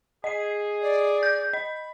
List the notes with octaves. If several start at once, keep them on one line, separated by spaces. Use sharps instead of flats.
G#4 D#5 C7
D5
G6
D#5 B5